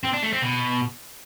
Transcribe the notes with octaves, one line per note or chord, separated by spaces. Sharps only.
C4
D4
A3
C4
B2